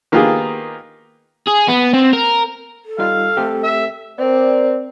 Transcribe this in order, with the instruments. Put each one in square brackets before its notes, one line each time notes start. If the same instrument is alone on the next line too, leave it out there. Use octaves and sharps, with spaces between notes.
[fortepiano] D#3 A#3 B3 F4 G4 G#4
[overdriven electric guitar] G#4
B3
C4
A#4
[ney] A4
[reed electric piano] G3 D#4 F4 [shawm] F5
[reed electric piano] A3 C4 G4
[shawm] E5
[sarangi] C4 [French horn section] A#4 D5